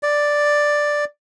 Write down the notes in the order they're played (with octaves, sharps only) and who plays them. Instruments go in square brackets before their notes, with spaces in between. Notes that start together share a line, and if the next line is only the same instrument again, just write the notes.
[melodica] D5